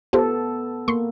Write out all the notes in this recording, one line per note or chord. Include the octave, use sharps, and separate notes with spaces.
B3 F4 G4 A4 C5
A#3 C6 C#6